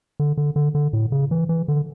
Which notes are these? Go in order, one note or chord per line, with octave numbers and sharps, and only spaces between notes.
D3
D3
D3
D3
A2
C#3
E3
E3
D3